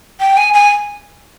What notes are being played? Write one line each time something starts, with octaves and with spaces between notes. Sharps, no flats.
G5
G#5
G#5